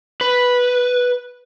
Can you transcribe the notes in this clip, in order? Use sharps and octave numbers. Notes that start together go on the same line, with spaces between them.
B4